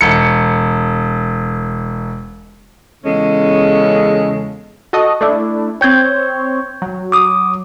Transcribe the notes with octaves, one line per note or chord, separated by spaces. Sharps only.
E1 C#7
E2 C#3 G#3 C#4 A4
F#4 A4 D#5
A3 D4 E4
C4 C#5 G5 G6 G#6
F#3
D6 D#6